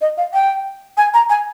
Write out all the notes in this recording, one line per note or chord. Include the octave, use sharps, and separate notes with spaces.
D#5
F5
G5
G#5
A#5
G#5